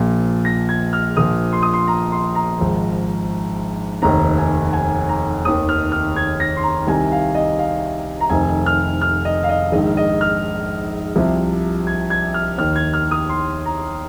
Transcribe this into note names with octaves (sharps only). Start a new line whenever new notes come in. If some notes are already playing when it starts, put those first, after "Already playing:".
Already playing: A#1 A#2 F3
A#6
G#6
F6
A#1 A#2 F3 D#6
C6
D#6
C6
A#5
C6
A#5
G#1 G#2 F3
F1 D#2 D#3 A#5
G#5
G#5
A#5
F1 D#2 D#3 D#6
F6
F6
G#6
A#6
C6
A#5
C2 C3 D#3 G#5
F5
D#5
F5
A#5
F1 F2 D#3 G#5
F6
F6
D#5
F5
D#5
A#1 G#2 D#3 D#5
D#5
F6
C2 C3 F3
G#6
G#6
F6
D#2 D#3 F6
G#6
F6
D#6
C6
A#5